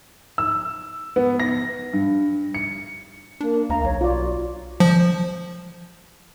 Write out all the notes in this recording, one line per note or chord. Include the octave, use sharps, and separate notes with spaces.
E6
B3
A#6
G2
C#7
A#3 D4
D2 D#5 F5 A#5
B1 C#5
F4 F#4 D5
F3